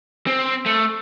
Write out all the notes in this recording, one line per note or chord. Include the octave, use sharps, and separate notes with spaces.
C4
A3